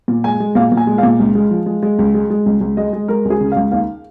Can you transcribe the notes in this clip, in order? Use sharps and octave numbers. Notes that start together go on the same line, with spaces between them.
A#2
G#3 G#5
G#3
A#2 F5
A#2
G#5
G#3
F5
A#2
C#2
G#3
F3
G#3
G#3
C#2
G#3
G#3
C#2
C#2
G#3 D#5
G#3
G#3 A#4
C#2
G#4
C#3
C#2 F5
D#2 F5